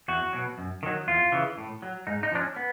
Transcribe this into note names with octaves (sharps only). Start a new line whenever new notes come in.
E2 F#4
B2 F#3
F#2
D#3 F#3
E2 F4
C#3 E3
A2
F#3
G#2 D#4
D#4
F3 D4
C#4
B3